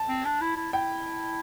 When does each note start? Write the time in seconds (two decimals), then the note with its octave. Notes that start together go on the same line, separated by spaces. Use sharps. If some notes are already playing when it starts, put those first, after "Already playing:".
Already playing: A5
0.09 C4
0.25 D4
0.41 E4
0.56 E4
0.73 E4 G5